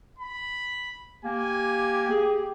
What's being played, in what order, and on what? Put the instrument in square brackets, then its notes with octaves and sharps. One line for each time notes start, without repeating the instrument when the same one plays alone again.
[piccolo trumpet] B5
[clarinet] A#3 [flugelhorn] G4 [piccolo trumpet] G#5
[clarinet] G#4